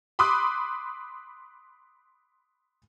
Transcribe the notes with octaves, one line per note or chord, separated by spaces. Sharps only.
B5 C6 D6 D#6 F#6